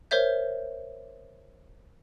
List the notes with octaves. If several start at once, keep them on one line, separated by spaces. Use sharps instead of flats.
A#4 C5 C#5 E5 G6